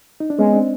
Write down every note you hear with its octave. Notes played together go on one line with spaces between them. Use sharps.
D#4
D4
G#3 B3 C#4
C4 D4